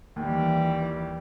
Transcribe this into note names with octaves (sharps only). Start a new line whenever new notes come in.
D#2 E3 G3